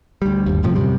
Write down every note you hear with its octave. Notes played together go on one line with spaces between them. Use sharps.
D2 G3
G1 D#2
F2 A2 C3 F3
F#2 C3 G3